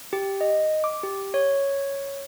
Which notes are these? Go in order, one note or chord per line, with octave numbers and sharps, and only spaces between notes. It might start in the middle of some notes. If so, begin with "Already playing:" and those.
G4
D#5
D6
G4
C#5